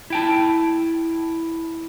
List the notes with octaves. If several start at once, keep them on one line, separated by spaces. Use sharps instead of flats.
E4 G5 A5